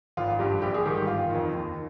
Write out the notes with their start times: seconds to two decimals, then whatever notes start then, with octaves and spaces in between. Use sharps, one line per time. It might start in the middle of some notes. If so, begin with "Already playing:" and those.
0.17 G#1 F4
0.39 G2 G3
0.62 A#1 G4
0.74 G#4
0.85 G#2 D#3 G3 G4
0.97 G4
1.07 G1 F4
1.30 F2 D#3
1.53 D#2